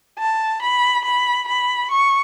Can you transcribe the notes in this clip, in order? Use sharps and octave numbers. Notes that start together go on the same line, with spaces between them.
A5
B5
B5
B5
C#6